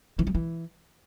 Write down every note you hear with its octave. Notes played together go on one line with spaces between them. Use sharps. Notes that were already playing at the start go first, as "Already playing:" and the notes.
E3
F#3
E3